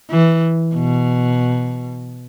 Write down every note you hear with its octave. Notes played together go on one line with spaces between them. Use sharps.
E3
B2